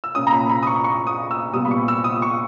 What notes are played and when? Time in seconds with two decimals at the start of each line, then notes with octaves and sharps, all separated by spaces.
0.04 E6
0.15 A#2 A#3 C#4 D#6
0.27 A#5
0.33 B5
0.50 B5
0.63 D#6
0.67 C#6
0.84 C#6
1.07 D#6
1.31 E6
1.53 A#2 G3 B3 D#6
1.65 B5
1.71 C#6
1.88 E6
2.04 D#6
2.22 C#6